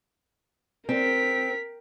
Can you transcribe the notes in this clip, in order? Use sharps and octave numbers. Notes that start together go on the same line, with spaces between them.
C4 A#4 B6